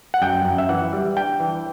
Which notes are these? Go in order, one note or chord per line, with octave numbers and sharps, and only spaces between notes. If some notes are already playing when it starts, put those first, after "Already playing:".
F#5
F#2 G5
F#2
E5
E3 F#5
G3
D4 G5
E3